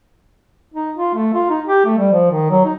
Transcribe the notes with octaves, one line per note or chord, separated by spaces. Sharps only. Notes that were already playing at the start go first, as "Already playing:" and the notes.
D#4
F4
A3
F4
D#4
G4
A3
G3
F3
D#3
F#3
D#4